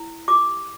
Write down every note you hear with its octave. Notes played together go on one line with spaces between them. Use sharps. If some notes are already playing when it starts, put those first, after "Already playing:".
Already playing: E4
G4 D6